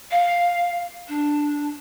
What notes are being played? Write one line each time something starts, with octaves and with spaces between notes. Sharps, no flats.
F5
D4